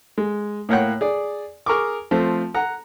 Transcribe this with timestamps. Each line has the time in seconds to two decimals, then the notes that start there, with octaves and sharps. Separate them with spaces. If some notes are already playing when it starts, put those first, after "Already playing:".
0.18 G#3
0.69 A2 A#3 C#5 F#5 G5 F#6
1.01 G#4 D5
1.66 G#4 A#4 C#6 D6
2.11 F3 A3 C4
2.54 F#5 A#5